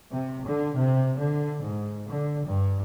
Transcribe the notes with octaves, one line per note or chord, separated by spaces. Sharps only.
C3
D3
C3
D3
G#2
D3
G2